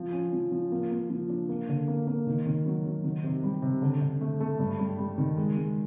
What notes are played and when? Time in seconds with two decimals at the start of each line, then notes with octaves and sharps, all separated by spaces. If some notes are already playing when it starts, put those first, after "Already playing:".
Already playing: F3
0.13 C#4
0.33 F3
0.52 F3
0.72 A#3
0.91 A#3
1.10 F3
1.29 D4
1.49 A#3
1.68 D3
1.88 A#3
2.07 A#3
2.27 D#3
2.46 D#3
2.66 F#3
2.85 F#3
3.04 D#3
3.23 C3
3.44 G3
3.62 C3
3.82 D3
4.01 D3
4.21 A3
4.40 A3
4.59 G2
4.79 G3
4.98 G3
5.18 D#3
5.37 G#3
5.57 G#3